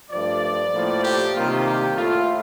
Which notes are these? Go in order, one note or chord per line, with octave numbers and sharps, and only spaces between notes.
G2 F3 A3 D5
A2 F3 A#3
G4
C3 D#3 G3 A#3 F4
G4
A2 A3 F4